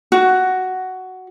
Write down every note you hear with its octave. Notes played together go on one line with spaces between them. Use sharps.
F#4